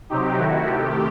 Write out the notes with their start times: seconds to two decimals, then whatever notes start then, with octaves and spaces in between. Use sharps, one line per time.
0.09 C3 F#3 C4 D#4 G4
0.38 D#3 A3 E4 F#4
0.66 C3 D#3 A3 G4